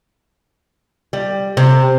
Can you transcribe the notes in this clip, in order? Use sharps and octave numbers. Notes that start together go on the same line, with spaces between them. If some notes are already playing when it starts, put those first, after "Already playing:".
G3
C3